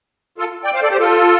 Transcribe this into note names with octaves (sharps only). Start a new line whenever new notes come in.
F4 A4
D5 G5
C5 F5
A4 D5
G4 C5
F4 A4